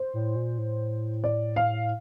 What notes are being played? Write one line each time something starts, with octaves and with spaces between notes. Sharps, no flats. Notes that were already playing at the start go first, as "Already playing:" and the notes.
Already playing: C5
A2
A#2
A2
D5
F5